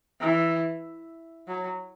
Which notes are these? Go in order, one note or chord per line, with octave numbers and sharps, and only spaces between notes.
E3
F#3